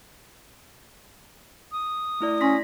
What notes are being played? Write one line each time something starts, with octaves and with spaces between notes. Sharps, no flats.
D#6
A3 E4 D5
C#4 C6 A#6 B6